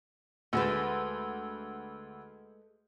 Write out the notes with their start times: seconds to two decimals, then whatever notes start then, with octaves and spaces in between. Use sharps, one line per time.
0.53 D2 G#3 A3 B4